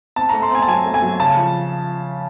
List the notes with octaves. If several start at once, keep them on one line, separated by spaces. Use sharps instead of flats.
C4 A5
A3 A#5
C6
C4 G#5
A5
F#3 G#5
A3
G#5
F#3
C#3 A5
F3